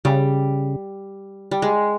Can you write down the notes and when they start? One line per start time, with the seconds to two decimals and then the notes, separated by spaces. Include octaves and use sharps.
0.05 C#3 G3
1.51 G3
1.62 G#3